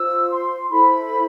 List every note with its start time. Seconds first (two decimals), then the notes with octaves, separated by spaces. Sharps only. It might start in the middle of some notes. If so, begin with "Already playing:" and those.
Already playing: F4 C5 E6
0.31 C6
0.70 E4 A4 C5 B5